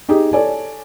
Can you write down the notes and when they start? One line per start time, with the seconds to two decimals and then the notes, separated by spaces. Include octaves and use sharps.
0.09 D#4 G4 G#4 D#5
0.33 A4 C#5 D5 G#5